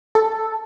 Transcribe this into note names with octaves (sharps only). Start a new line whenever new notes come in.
A4